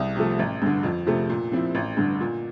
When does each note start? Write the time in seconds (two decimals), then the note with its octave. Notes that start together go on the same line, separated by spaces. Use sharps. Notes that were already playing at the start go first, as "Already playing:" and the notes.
Already playing: C2
0.16 C3 F3 A3
0.39 A1
0.62 G2 D3
0.83 F2
1.06 C3 F3 A3
1.30 A#2
1.52 F3 C4 E4
1.75 A1
1.97 G2 D3
2.21 A#2